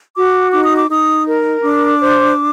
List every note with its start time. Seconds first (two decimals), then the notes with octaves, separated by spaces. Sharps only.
0.15 F#4 D6
0.52 D#4 D6
0.65 D#6
0.77 D6
0.90 D#4 D#6
1.27 A#4
1.63 D4 D6
2.01 C5